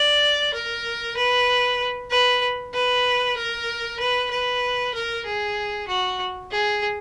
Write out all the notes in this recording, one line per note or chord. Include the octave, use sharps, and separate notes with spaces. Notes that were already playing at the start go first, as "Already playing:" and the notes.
Already playing: D5
A#4
B4
B4
B4
A#4
B4
B4
A#4
G#4
F#4
G#4